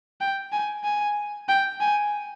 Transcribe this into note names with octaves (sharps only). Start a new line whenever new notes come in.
G5
G#5
G#5
G5
G#5